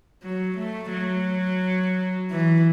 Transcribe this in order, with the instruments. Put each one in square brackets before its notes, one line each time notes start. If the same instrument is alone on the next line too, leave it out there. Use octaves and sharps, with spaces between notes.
[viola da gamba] F#3
A3
F#3
E3